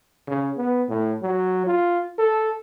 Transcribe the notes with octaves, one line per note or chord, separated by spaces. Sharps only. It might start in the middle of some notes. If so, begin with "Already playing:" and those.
C#3
B3
A2
F#3
F4
A4